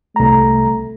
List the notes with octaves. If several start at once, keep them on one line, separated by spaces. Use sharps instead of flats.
C2 A3 A#5